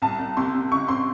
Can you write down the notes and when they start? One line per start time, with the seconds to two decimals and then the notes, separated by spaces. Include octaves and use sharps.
0.02 C2 A5
0.19 C2
0.37 C3 C6
0.55 C3
0.71 C#2 C#6
0.88 C4 C6